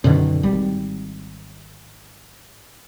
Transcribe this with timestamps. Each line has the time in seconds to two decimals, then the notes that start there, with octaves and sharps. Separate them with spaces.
0.04 F#2 B2 D3 D#3
0.43 G#1 G3